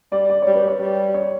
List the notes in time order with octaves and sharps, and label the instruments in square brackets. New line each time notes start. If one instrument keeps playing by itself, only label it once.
[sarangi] G3 [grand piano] D5
[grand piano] D5
[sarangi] G3 [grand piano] C#5
[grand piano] B4
C#5
[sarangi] G3
[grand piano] C#5